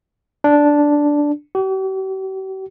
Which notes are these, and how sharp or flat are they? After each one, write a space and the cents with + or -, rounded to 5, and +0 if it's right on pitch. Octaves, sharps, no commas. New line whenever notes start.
D4 -5
G4 -45